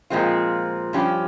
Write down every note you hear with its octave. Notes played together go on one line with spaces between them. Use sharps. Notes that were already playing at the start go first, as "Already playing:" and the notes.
A#2 F3 G#3 C4 F4
G2 F3 C#4 G4